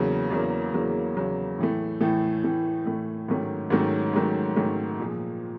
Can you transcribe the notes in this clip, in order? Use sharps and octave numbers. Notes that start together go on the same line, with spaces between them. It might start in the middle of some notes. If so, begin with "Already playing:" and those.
Already playing: E2 C#3 F#3 A#3
E2 C#3 F#3 A#3
E2 C#3 F#3 A#3
E2 C#3 F#3 A#3
A2 E3 A3
A2 E3 A3
A2 E3 A3
A2 E3 A3
G#2 D#3 F#3 A3 C#4
G#2 D#3 F#3 A3 C#4
G#2 D#3 F#3 A3 C#4
G#2 D#3 F#3 A3 C#4
A#2 F3 G#3